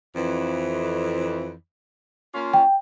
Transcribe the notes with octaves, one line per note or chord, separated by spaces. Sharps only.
F2 E3
A#3 C#4 F4
G5